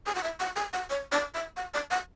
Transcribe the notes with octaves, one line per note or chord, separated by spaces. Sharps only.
G#5
F#5
E5
F#5
G#5
F#5
C#5
D5
E5
F#5
D5
F#5